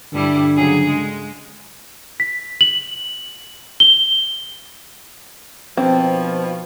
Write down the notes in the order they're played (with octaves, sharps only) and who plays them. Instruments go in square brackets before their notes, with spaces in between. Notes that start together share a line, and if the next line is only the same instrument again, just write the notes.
[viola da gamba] G2 G3 E4 [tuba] D3
[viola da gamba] C#3 F#3 G#4
G#3
[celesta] B6
F#7
G7
[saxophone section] B2 D#3 F3 [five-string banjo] C4